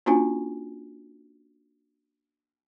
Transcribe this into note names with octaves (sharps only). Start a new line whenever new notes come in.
A#3 C#4 D4 F4 F#4 G#5